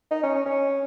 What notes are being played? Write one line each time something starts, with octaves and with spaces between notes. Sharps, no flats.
D#4
C#4
C#4
C#4